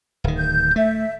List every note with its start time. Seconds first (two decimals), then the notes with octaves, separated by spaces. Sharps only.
0.24 D1 D#3
0.38 G6
0.76 A3 E5